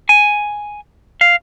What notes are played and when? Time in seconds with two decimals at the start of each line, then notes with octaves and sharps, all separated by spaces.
0.09 G#5
1.21 F5